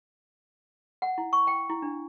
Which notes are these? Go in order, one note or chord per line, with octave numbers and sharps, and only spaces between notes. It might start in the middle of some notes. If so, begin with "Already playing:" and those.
F#5
E4
C#6
G5
E4
D4